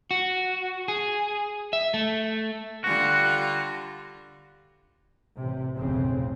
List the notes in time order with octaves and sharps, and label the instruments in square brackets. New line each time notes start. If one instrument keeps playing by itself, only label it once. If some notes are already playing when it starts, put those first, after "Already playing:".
[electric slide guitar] F#4
G#4
E5
A3
[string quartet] D3 G3 F4 [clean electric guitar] F#4
[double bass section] A1 C3
F1 B1 F2 A2 C#3 C4